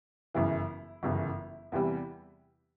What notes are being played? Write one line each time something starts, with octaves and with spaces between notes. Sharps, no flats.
G1 F#2 C#3 E3 E4
G1 F#2 C#3 E3
E2 C3 E3 G3